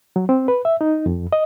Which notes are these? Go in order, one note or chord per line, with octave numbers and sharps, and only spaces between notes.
F#3
C4
B4
E5
D#4
F2
D#5